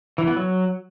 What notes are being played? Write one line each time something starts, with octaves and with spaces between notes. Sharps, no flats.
E3
B3
F#3